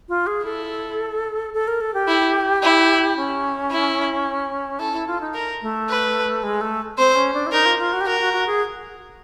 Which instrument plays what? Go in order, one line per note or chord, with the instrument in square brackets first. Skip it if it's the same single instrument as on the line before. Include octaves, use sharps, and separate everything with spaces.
[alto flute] F4
G#4
[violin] E4 [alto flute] A4
[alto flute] A4
A#4
A4
G4
[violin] E4
E4
[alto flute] C#4
[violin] E4
[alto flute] E4 [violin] A4
[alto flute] E4
F4
D#4
[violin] A#4
[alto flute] A3
[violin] B4
[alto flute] G#3
A3
[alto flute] C4 [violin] C5
[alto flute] C#4
D4
E4
[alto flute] D#4 [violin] A#4
[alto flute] F4
F4
F#4
G4
[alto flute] F#4 [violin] A#4
[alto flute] F#4
F#4
G#4